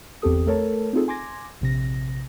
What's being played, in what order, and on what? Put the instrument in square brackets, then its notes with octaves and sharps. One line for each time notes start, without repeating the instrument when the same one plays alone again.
[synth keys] G1 E2 C4 G4 A4 D#6
A3 A4 A#4 C#5 A5
C4 D#4 F4 G#4 A4
G#5 C6 D6 G#6 A#6
A#1 C3 A#6